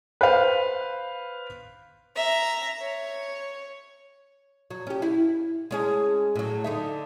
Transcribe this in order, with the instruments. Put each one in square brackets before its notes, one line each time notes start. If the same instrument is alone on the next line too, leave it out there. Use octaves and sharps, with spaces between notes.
[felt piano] B4 C5 F5
[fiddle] E5 A#5
C#5
[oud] F#3
C#4 G4
E4
G#3 C#4 G#4
A2 F#3
D3 D#4 E5